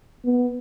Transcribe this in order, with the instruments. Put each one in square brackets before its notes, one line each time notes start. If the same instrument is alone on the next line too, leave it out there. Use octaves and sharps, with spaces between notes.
[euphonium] B3